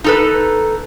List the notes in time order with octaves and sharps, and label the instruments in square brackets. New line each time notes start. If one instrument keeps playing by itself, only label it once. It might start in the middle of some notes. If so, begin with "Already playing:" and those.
[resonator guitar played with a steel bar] D#4 A4 B4